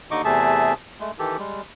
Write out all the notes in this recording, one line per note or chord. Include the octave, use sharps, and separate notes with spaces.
D#2 D3 D#4 D#5 C#6 D6
E2 C3 A3 G#4 E5 A5
G#3 A3
D#3 E3 G4 A4
G3 G#3